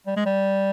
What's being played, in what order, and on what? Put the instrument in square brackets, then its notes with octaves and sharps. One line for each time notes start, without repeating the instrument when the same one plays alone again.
[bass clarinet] G3
G#3
G3